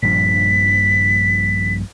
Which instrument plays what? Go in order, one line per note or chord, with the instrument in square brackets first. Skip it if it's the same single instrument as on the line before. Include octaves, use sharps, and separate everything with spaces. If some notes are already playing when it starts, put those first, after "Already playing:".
[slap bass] A#1 G2 F3 [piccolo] B6